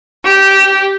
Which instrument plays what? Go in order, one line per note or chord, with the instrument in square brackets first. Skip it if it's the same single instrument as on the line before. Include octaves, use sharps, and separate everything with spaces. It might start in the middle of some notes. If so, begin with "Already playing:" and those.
[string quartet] G4